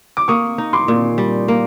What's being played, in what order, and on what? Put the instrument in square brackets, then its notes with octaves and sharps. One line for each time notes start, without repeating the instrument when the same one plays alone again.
[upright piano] D6
[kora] A#3 [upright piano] C#6 D#6
[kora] D#4
[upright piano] C6 D6
[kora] A#2
G3
A#3